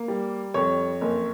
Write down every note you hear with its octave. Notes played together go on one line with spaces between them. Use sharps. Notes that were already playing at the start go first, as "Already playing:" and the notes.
Already playing: A#3
G3
F2 C#5
F#1